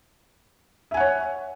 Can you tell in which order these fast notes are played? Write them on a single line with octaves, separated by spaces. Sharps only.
E5 G#5 F#5 C#5